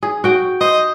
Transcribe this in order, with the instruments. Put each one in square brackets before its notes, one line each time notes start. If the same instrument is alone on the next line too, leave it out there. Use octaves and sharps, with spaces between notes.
[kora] G#4
F#4 G5
[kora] C5 [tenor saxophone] D#5